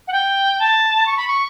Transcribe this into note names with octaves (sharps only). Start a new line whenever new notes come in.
F#5
G5
A5
C#6
B5
C#6